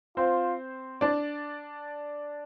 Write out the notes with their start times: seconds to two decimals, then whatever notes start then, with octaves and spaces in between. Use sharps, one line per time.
0.17 C4 F4 C5
1.01 D4 D5